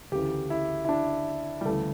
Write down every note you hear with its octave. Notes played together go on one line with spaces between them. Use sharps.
D2 C#3 E3 G4
E4
E4
D4
G3
D2 C#3 E3 A3